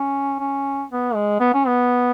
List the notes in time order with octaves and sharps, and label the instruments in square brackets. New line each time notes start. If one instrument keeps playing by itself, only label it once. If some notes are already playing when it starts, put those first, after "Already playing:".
Already playing: [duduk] C#4
C#4
B3
G#3
B3
C#4
B3